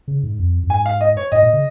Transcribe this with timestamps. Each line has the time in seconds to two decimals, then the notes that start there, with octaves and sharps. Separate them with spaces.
0.08 C#3
0.23 G#2
0.39 F2
0.63 F2
0.69 G#2 G#5
0.86 F5
1.01 D#5
1.17 C#5
1.32 G#2 D#5
1.42 A#2
1.53 C#3